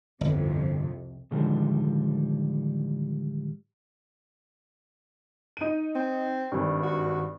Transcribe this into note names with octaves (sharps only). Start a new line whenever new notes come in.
G1 C2 F2 C3
A2 D3 D#3 F3 G3 G#3
D#4 D#7
C4
G#1 G2
F#4